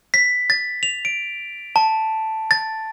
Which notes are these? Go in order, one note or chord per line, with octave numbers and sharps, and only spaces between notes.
B6
A6
F7
D7
A5
A6